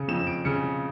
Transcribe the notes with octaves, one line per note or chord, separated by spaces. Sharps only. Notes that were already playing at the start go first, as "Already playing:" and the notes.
Already playing: C#3 C#7
F2 E7
D7
C#3 C#7